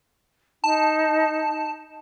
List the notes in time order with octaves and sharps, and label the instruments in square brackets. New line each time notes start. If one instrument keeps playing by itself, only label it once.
[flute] D#4 [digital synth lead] A5